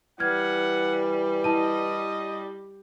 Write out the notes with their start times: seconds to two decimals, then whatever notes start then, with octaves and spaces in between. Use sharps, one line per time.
0.20 E3 G3 F#5 F6 G#6
1.44 E4 D#5 A5 D#7